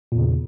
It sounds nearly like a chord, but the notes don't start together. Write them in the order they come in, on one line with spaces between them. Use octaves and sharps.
A#2 E2 C#3